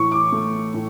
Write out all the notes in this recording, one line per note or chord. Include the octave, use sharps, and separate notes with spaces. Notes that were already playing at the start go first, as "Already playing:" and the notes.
Already playing: A2 E3 C#6
D6
A3
A2